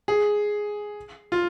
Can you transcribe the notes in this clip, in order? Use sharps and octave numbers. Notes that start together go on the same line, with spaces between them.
G#4
F4